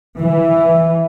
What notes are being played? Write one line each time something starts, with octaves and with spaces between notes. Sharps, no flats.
E3